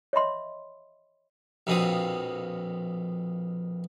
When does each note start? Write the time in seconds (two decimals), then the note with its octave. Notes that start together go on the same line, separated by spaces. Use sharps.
0.13 C#5 D#5 E5 B5 C6
1.67 A#1 F2 B2 C4 D#6